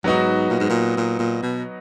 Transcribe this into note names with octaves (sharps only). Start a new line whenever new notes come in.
G#2 F#3 B3 D#4 F#4
A#2
G#2
A#2
A#2
A#2
B2